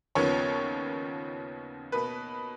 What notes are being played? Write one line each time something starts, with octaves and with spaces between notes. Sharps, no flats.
D#2 C#3 F3 B3 C#5
B2 A#3 B4